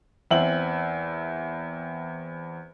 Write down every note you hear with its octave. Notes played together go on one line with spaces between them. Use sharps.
E2 C4 E5 F#7